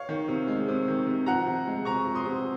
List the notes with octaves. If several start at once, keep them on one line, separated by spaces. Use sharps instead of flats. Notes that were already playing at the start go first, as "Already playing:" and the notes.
Already playing: C#5 F5
D#3
C3
G#3
C3
D#3
C3
F3 F#5 A#5
C3
G#3
C3 A#5 C#6
F3
C6 D#6
C3